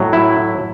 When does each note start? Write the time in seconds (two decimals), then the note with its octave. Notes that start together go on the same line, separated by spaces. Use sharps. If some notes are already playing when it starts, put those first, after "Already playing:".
Already playing: A2 F#3
0.13 E4